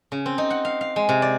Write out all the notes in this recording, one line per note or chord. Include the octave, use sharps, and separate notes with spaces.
C#3
C4
D#4
F#5
F5
F5
G#3
C3
D5